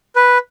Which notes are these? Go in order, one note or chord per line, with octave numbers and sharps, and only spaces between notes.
B4